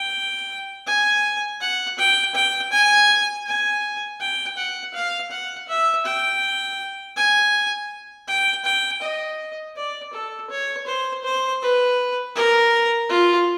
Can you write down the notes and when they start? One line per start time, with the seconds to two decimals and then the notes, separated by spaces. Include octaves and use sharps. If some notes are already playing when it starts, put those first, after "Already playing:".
Already playing: G5
0.87 G#5
1.61 F#5
1.98 G5
2.35 G5
2.72 G#5
3.47 G#5
4.20 G5
4.57 F#5
4.94 F5
5.31 F#5
5.68 E5
6.06 G5
7.16 G#5
8.28 G5
8.65 G5
9.02 D#5
9.76 D5
10.13 A4
10.50 C#5
10.87 C5
11.24 C5
11.62 B4
12.36 A#4
13.09 F4